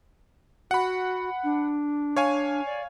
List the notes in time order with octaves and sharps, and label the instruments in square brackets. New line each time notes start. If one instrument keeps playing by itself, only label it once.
[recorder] F#4 [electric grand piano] F#5 B5
[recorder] D4
[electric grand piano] C#5 F5 G#5
[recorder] D5